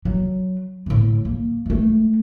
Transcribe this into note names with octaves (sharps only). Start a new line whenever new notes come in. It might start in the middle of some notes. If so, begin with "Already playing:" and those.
F#3
A2 D3
A#3
G#3 A3